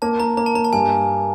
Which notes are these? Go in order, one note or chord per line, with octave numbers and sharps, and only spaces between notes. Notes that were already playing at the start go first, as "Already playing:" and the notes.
A#3 A5
A#3 A#5
A#3 A#5
A5
A#3 A#5
A5
G2 G#5